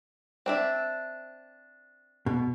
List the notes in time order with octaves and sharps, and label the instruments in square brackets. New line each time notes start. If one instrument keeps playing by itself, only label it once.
[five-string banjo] C4 D4 E5
[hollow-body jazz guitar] B2